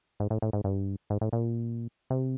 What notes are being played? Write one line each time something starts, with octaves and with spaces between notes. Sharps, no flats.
G#2
A2
A2
G#2
G2
G#2
A2
A#2
C3